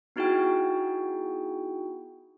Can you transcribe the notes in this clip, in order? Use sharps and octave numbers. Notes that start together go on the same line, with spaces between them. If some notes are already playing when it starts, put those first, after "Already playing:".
B3 D#4 E4 F#4 G#4 G5